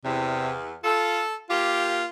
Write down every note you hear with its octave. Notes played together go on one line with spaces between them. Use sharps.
E2 C3
F4 A4
A#3 F4 G4